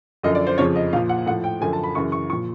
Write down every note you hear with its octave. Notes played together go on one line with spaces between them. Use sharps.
F#2 D3 F3 D#5
D5
C5
F2 C#3 F3 C#5
D#5
A#2 F3 F5
F#5
A2 F3 F#5
G5
F#2 D3 F3 G#5
A5
B5
F#2 C#3 E3 C#6
C#6
A#2 F3 C#6